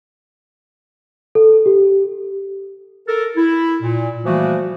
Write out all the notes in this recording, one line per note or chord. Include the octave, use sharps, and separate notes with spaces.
A4
G4
A4 A#4
E4
A#2
E3 F3 G3 A3 A#3 F#4